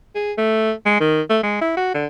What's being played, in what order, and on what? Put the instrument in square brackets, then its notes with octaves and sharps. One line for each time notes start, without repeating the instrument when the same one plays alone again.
[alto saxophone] G#4
A3
G#3
D#3
A3
G#3
E4
F#4
D3